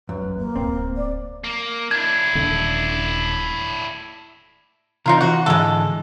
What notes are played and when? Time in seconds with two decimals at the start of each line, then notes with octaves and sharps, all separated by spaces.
0.09 F#2 B4
0.22 D#3 F3
0.38 A#3
0.56 D1 C4
0.96 D5
1.44 A#3
1.91 D4 E4 G#6
2.35 D#1 D3
5.06 C3 E3 D#4 F4 A#4
5.21 E3 F#4
5.46 G#2 D3 E3 G#3 A4